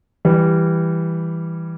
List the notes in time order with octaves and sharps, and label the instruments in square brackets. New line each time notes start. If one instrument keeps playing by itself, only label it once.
[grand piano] E3 G3